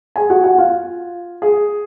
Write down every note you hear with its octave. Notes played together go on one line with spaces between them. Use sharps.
G#4 G#5
F#4 F#5
F#4 F#5
F4 F5
G#4